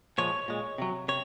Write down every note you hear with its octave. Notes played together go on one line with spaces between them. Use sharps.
A#2 F3 G#3 C#5
A#2 G#3
C3 F#3
C3 C#5